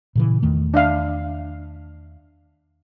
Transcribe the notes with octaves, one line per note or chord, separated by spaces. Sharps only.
A#2 C#3 E3
E2 D#3 A3
D4 E5 F5